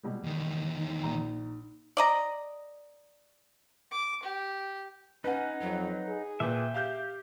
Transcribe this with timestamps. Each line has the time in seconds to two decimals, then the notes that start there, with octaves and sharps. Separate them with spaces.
0.03 B2 G3 G#3
0.24 E2 D#3
0.78 D#4
1.03 A#1 A#5
1.97 D5 D#5 A#5
3.91 D6
4.23 G4
5.24 C#4 D#4 B4 F#5
5.61 F2 F#3
6.08 G#4
6.40 A#2 B4 E5 G5
6.74 G4 F5 G6